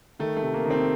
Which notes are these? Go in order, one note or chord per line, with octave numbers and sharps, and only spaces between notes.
D#3 A3
A3
C3
A#3
D#3
C4